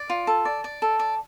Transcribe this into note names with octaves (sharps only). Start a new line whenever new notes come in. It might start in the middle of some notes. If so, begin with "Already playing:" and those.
Already playing: D5
F4
A4
D5
D5
A4
D5